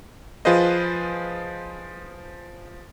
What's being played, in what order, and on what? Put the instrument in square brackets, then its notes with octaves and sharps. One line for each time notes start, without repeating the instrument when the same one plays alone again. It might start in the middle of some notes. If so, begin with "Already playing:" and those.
[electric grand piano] F3 F4 G#4 B4 C5 D#5